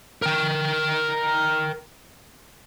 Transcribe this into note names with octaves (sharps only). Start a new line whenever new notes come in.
A#4 G5